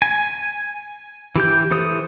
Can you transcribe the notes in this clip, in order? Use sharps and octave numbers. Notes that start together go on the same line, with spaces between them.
G#5
E3 G4 G6
E3 A4 C5 D#6